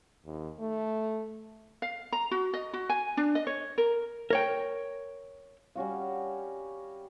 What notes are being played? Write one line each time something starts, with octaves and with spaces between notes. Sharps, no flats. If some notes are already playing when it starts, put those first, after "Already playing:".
D#2
A3
F5
A#5
F#4
D#5
F#4
G#5
D4
D#5
C#5
A#4
A#4 C#5 G5
G3 C#4 F#4 F5